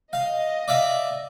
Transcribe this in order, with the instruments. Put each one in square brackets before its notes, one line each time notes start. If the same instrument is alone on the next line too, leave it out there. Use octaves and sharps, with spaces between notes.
[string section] D#5 [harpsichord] F5
[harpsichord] D5 E5 F5